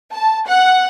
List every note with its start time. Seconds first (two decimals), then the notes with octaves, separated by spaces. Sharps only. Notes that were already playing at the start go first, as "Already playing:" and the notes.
0.12 A5
0.46 F#5